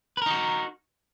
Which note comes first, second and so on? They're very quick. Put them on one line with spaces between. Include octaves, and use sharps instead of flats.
B4 A#4 D#4 F#4